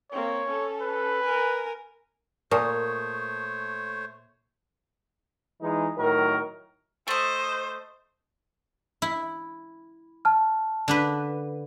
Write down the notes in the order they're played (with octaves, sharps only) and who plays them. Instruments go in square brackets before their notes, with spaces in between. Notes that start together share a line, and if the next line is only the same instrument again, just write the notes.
[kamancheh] A#3 C4 [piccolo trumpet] C#5
[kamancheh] C#4 A4
[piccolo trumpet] B4
[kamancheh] A#4 G#5
[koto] A#2 [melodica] A3 C5 C#5 [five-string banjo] A#4 [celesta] A5 C#6 D#6
[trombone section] E3 G#3 D#4
A2 D#3 F#3 A#4
[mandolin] A3 D#5 [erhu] C5
[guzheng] E4
[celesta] A5 F6
[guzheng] D3 D4 B4